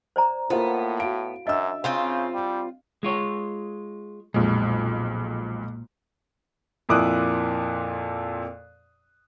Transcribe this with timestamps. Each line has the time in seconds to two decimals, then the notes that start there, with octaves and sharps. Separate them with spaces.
0.16 C5 D5 A#5
0.50 A2 A#3 B3 E4 F4 C5
1.00 F#4 F5 D7
1.47 F#2 D4 D#5 E5 E6
1.84 C#3 C4 F4 C5 F5
2.34 G3
3.03 G#3 F4 C#5
4.34 B1 F2 A#2 G#3
6.89 F2 A#2 E4 D6 D#6 F#6